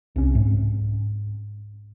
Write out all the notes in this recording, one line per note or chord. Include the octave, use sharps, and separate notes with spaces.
C2 C#4
G#2